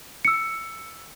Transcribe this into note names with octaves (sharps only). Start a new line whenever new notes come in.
E6 C#7